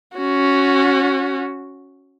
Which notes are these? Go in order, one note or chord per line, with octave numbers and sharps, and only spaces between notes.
C#4 F#4